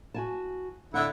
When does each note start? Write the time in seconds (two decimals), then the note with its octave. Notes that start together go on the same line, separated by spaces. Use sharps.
0.14 F#4 G#5 A5
0.94 D3 E4 E5 F#5